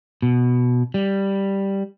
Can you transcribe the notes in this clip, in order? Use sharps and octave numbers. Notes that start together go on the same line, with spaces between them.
B2
G3